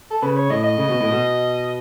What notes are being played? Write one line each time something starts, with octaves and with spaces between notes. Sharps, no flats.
A4
C#3 B4
C#5
A2 D#5
D#5
C#3
B2
A2
B2